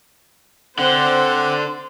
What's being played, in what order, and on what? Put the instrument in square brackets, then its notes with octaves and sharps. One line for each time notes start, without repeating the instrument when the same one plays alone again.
[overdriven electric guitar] D3 [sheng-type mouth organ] C4 F#5 [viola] C5 D5